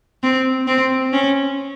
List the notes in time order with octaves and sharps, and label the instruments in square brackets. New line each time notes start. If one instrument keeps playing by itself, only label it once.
[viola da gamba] C4
C4
C#4